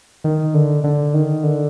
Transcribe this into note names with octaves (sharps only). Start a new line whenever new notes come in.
D#3
D3
D3
D#3
D3